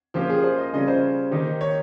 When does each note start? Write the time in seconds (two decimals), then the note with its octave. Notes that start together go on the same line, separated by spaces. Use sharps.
0.14 F3 A#3 C#4 F4 G4
0.30 G#4
0.44 C5
0.58 D#5
0.73 C#3 G3 C#4 F4 D#5
0.88 C5
1.31 D#3 A#3 D#4 G4
1.61 C#5